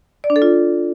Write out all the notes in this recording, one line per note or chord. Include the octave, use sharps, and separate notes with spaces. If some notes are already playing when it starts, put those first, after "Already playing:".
D5
D4
A4
F4